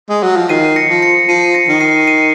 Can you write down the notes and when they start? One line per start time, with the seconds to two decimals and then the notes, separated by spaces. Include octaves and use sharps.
0.09 G#3
0.23 F#3
0.36 F3
0.49 D#3 C7 D#7
0.76 A#6 C#7
0.89 F3
1.02 A#6 C#7
1.28 F3 C7 D#7
1.54 A#6 C#7
1.69 D#3
1.81 C7 D#7
2.07 C7 D#7
2.18 C#7